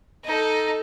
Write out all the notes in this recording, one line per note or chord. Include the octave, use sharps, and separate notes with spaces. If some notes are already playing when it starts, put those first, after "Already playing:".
D#4 A4